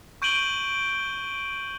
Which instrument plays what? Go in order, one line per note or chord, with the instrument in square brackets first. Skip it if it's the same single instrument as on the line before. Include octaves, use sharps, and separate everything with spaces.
[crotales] C#6 G6 D7 D#7 F#7 G7